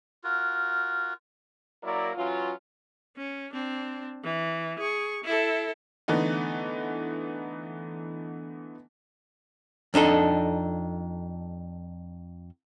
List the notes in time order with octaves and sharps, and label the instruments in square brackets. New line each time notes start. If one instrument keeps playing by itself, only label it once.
[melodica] F4 F#4 A#4
[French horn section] F#3 A#3 E4 A#4 D5
E3 F#3 C#4 F4
[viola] C#4
C4 D4
E3
G#4 C#6
E4 A4
[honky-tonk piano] D3 E3 A3 B3 D#4
[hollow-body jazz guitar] F2 D4 D#4 A4